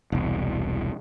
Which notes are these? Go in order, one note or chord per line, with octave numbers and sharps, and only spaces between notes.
E1 C2